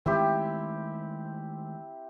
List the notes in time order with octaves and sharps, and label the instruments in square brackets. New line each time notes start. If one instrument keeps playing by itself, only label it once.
[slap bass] D#3 G#3 A3 [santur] C4 E4 G4